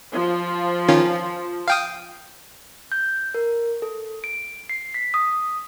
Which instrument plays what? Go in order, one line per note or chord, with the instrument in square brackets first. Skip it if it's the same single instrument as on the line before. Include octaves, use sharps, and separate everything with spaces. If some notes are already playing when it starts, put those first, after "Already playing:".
[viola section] F3
[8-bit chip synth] D#3 C#4 F4
F5 G5 D#6
[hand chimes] G6
A#4
A4
D7
C7
B6
D#6